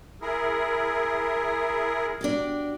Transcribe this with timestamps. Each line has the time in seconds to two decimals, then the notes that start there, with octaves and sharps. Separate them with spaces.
0.22 E4 G#4 A#4
2.21 D4 F#4 G4